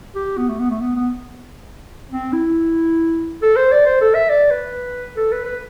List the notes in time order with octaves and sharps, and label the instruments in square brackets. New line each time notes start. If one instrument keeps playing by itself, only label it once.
[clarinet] G4
B3
A3
B3
A3
B3
B3
C4
E4
A4
C5
D5
C5
A4
E5
D5
B4
A4
B4
B4